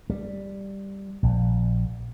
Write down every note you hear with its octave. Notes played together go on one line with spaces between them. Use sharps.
G3
A#1